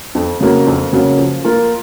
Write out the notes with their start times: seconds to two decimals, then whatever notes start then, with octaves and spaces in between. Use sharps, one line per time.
0.15 F2
0.40 C#3 F#3 A#3
0.66 F2
0.93 C#3 F#3 A#3
1.19 F3
1.44 A#3 F4 A#4